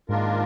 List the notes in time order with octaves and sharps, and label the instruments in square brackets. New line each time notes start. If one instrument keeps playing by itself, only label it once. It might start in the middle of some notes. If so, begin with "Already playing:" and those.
[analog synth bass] G#2 [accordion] D#3 A#3 D4 F4 A#4